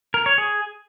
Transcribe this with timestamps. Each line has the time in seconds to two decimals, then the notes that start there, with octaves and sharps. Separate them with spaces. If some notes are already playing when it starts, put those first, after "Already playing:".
0.14 A#4
0.26 C#5
0.38 G#4